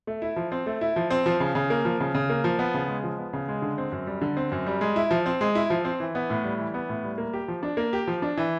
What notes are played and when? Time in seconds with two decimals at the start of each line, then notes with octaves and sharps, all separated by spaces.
0.07 A3
0.22 E4
0.36 F3
0.52 C4
0.66 A3
0.81 E4
0.96 F3
1.10 C4
1.26 F3
1.40 C#3
1.55 C#3
1.70 A#3
1.85 F3
2.00 C#3
2.15 C#3
2.30 A#3
2.44 F3
2.59 B3
2.74 C#3
2.88 G#3
3.04 F3
3.19 B3
3.33 C#3
3.48 G#3
3.62 D3
3.78 C4
3.92 F#2
4.07 G3
4.21 D3
4.37 C4
4.52 F#2
4.67 G3
4.81 G#3
4.96 E4
5.11 F3
5.26 C4
5.41 G#3
5.55 E4
5.70 F3
5.85 C4
6.00 E3
6.15 B3
6.30 A2
6.44 G3
6.59 E3
6.74 B3
6.89 A2
7.04 G3
7.18 A#3
7.33 G4
7.48 F3
7.63 D4
7.77 A#3
7.93 G4
8.07 F3
8.22 D4
8.37 E3